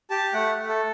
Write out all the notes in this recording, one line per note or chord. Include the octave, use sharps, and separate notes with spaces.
G4 A5
A3 F#5
A3
A4